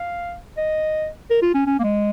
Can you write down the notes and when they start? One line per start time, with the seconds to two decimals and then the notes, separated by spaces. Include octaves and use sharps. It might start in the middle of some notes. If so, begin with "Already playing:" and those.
Already playing: F5
0.57 D#5
1.30 A#4
1.42 F4
1.54 C#4
1.66 C#4
1.79 A#3
1.84 G#3